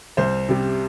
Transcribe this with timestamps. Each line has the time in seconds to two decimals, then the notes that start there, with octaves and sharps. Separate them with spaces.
0.17 C2 C5
0.49 C3 G3